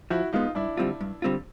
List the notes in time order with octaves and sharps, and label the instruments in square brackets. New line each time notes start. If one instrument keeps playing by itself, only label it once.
[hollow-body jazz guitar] F3 [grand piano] E4 F#4
[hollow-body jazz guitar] G#3 B3 [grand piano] D#4 F4
[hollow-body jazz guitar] G2 [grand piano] D4 E4
[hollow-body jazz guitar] D3 G3 C4 F4
G2
D3 G3 C4 F4